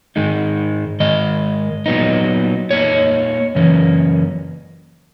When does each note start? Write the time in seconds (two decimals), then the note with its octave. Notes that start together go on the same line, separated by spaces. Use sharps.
0.16 G#2 D#3 G#3 D#4
1.00 G#2 D#3 G#3 D#5
1.86 A#2 F#3 B3 D#4
2.70 A#2 A#3 D#4 C#5
3.55 F#2 C#3 E3 A#3 C#4